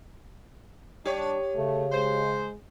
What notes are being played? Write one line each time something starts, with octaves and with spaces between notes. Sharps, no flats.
G3 D4 G4 C#5
C#3 A3
G#3 C5